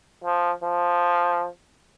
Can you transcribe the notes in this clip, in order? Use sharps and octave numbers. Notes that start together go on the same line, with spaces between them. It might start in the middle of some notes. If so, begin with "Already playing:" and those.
F3
F3